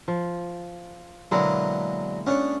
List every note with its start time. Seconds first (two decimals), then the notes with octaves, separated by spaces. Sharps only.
0.08 F3
1.31 B2 D3 F#3 G#3 A#3 E4
2.27 B3 C#4 D4 C#5